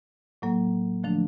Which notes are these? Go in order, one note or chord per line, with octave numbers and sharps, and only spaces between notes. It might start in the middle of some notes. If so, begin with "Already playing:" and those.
A2 F#3 A#3
D3 F3 A3 D4